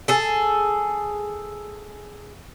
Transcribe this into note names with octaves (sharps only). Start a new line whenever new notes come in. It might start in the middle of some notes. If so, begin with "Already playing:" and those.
G#4 A4